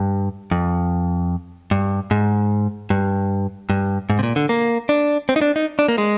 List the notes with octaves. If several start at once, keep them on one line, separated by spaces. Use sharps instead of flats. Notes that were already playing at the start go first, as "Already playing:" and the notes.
Already playing: G2
F2
G2
G#2
G2
G2
G#2
C3
A#2
D3
A#3
D4
C4
D#4
D4
D#4
D4
A#3
G#3